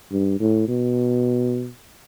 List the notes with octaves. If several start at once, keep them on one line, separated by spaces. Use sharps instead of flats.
G2
A2
B2